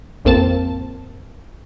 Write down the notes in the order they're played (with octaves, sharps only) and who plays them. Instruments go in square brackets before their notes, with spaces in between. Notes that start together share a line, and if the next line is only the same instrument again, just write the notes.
[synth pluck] A1 F2 A#3 C4 A5